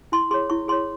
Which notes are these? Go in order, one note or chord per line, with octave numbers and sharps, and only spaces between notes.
E4 C6
G#4 C#5 C6
E4 C#6
G#4 C#5 C6